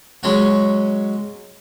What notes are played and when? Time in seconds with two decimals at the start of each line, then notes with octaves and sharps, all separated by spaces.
0.23 F#3 G#3 C#4 F#4